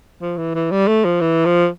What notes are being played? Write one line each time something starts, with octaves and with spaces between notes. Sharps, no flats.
F3
E3
E3
G3
A3
F3
E3
F3